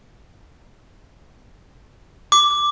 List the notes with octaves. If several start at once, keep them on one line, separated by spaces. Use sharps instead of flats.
D6